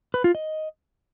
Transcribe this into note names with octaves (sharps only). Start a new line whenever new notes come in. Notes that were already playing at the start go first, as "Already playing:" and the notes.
B4
F4
D#5